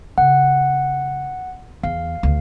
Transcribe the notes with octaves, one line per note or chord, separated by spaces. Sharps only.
C#3 F#5
E2 F5
D2